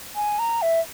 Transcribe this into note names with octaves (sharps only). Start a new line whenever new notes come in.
G#5
A#5
E5